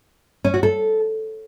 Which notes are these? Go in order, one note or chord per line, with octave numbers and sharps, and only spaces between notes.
C#4
F#4
A4